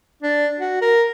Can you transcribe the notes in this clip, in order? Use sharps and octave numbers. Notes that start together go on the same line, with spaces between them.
D4
F#4
A#4